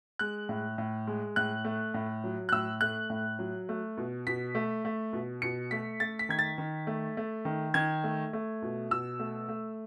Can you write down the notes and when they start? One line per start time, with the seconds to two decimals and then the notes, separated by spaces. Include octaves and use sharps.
0.19 G#3 F#6
0.49 A2
0.78 A2
1.07 G#3
1.36 A2 F#6
1.65 A3
1.94 A2
2.24 F#3
2.49 F#6
2.52 A2 E6
2.81 A3 F#6
3.10 A2
3.39 F#3
3.69 A3
3.97 B2
4.27 B2 B6
4.55 A3
4.85 A3
5.13 B2
5.42 B2 C#7
5.71 A3 B6
6.00 A3 A6
6.19 B6
6.29 D#3 G#6
6.39 A6
6.58 D#3
6.87 A3
7.17 A3
7.45 D#3
7.74 D#3 G#6
8.04 A3
8.33 A3
8.62 B2
8.91 B2 E6
9.20 A3
9.49 A3